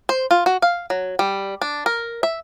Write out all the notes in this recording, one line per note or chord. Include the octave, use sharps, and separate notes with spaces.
C5
F4
F#4
F5
F#3
G3
D4
A#4
E5